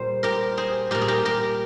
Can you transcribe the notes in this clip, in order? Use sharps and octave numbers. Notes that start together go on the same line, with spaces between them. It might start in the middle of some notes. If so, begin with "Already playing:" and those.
Already playing: A#2 G3 C5
G4 A#4
G#4 C5
A#2 G3 G4 A#4
G#4
G4 A#4
G4 A#4